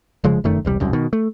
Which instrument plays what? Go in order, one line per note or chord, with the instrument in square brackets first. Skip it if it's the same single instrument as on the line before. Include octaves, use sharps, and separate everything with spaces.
[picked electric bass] F1 C#3 F3 G#3
F1 F#2 D#3 A3
E1 C2 G3
E1 C2 F#2
B2 D#3
A3